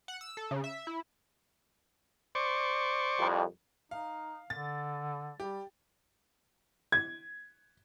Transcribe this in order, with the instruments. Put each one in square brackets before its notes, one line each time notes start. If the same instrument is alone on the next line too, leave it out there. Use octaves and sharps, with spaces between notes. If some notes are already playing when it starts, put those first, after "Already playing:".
[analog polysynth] F#5
E6
A4
C#3
E5
E4
[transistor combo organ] C5 D5 C#6
[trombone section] C2 F2
[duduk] D#4 [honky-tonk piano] F5
[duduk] D3 [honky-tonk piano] A6
[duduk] G3 [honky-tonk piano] G4
[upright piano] G#6